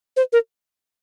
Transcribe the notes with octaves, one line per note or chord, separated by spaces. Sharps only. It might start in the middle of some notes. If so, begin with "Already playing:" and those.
C5
A#4